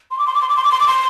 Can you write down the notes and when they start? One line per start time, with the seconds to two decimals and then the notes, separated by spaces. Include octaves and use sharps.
0.11 C6
0.19 D6
0.27 C6
0.34 D6
0.42 C6
0.49 D6
0.57 C6
0.64 D6
0.72 C6
0.80 D6
0.88 C6